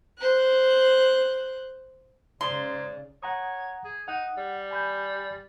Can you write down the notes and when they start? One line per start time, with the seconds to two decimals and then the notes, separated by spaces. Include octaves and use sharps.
0.18 C5 F#6
2.41 G#2 C#3 D5 C6
3.23 C#5 F#5 A#5 D#6
3.85 G#4
4.08 D#4 F#5
4.37 G3
4.71 G#5 B5 G6